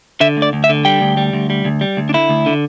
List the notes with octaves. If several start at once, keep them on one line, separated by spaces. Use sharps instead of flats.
D3 E5
D2
D5
D2
E5
D3
G3 G5
D2
G3
D2
G3
D2
G3
D2
D4
D3 E4
D2
D3